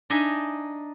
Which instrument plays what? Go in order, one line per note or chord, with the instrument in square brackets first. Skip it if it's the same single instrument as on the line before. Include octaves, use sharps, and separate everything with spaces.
[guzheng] D4 D#4 D#5 E5 G#5